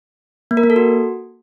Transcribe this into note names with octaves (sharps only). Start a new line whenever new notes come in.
A#3
A#4
A#3
A4
F#4